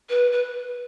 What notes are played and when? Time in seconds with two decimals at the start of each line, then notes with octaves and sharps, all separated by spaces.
0.09 B4
0.32 B4